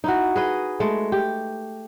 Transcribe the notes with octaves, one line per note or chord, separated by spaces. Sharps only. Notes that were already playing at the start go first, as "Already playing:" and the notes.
D#4 E4 F#4
G#4 B4 D#5
G#3 A3
G4